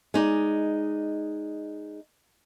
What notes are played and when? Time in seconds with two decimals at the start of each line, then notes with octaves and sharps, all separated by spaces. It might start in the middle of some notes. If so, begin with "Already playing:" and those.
0.14 G#3 D#4 D5